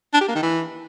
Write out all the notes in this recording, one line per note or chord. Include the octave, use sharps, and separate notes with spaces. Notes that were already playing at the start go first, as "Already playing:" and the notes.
D4
G4
A#3
D#3
E3